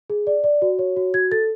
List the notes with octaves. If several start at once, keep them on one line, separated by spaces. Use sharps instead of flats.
G#4
D5
D5
F#4
C#5
F#4
F#4 G#6
A4 A6